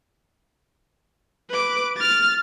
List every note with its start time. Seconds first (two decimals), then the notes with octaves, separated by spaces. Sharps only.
1.50 B4 D6
1.97 F6 A6